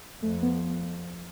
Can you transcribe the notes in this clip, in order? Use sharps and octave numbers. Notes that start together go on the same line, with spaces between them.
F2 A3
B3